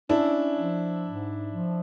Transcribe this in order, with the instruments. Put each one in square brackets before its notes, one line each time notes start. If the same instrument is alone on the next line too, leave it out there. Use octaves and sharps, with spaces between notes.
[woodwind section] C#4 [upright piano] D4 E4
[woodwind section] F3
G#2
F3